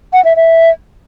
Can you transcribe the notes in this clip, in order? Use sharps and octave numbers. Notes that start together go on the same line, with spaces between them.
F#5
E5
E5